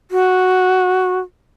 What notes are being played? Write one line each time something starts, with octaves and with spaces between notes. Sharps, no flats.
F#4